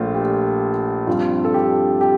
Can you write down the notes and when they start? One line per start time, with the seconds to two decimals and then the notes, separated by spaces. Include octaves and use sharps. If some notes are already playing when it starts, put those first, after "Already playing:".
Already playing: A#1 A#2 A3 F4
0.15 G4
1.07 G2 F3 C4 F4
1.44 A4
1.54 G4
2.01 G4